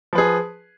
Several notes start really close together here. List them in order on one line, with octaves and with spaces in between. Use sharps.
F3 B4 G#4